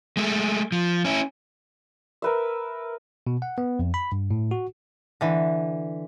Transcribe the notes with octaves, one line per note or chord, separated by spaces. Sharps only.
G#3 A3
F3
C#4 E4
A#4 B4 E5
B2
F#5
B3
F2
B5
G2
A2
F#4
D3 E3